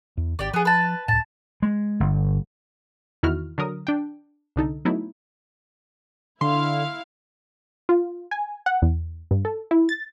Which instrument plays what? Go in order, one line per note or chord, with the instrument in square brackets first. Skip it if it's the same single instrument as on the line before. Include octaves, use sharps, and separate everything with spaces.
[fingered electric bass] E2
[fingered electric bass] G#1 [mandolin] G4 D5
[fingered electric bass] F3 [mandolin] B3 G#4
[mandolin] B4 A5
[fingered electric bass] C#2 A2 [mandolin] A5
[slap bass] G#3
G1
[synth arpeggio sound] E2 D#3 E4 F#4 F6
D3 F#3 A#4 D#6
D4 G5
C2 D3 D#4 A4
F#3 A3 B3 D#4 E4
[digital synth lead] D3 [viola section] E4 F5 [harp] C6
[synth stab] F4
G#5
F#5
E2
G2
A4
E4
A6